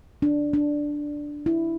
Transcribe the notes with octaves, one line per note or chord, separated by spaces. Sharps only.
D4
D4
E4